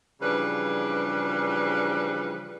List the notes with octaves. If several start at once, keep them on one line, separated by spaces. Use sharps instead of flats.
C#3 E3 F3 G3 D4 B4